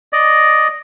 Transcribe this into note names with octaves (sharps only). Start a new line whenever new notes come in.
D5 D#5